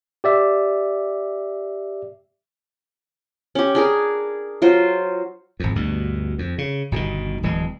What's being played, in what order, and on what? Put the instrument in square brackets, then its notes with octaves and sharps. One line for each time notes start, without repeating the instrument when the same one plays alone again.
[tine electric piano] G4 D5 E5 D6
[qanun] C#4 G4
D4 G#4 A#4
F#3 F4 C5
[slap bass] G#1 F2
D2 G2 B2
F2
C#3
G1 B2 D3 D#3
D1 E3 G#3